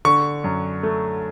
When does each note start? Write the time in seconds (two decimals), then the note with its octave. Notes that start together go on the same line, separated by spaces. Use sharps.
0.05 D3 C#6
0.44 F#2
0.83 A3